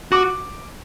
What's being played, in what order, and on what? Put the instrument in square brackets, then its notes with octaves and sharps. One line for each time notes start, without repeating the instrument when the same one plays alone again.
[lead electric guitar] F#4 [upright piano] D6